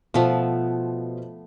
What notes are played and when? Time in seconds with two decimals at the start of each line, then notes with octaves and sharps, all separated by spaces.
0.14 B2 F3 A3 B3 C5